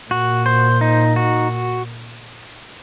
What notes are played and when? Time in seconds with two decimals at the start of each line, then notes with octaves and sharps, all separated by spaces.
0.11 A#2 F#4
0.46 C5
0.81 D#4
1.16 F#4